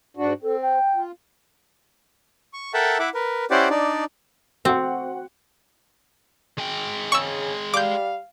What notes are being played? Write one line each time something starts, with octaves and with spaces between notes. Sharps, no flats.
G#2 D4 F#4
C4 A4
G5
F4
C#6
A4 A#4 E5 F#5 G5 A5
E4 E5 F#5 D6
A#4 B4
C#4 E4 G4 C5 D5 F#5
D4 D#4 D5
C4 F#4 F#5
G#3 G5
C#3 C#6 E6
G3 F5 D6 G6